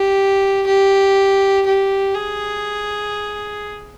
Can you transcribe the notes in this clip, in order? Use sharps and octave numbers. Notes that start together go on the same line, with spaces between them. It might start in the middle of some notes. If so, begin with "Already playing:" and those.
Already playing: G4
G4
G4
G#4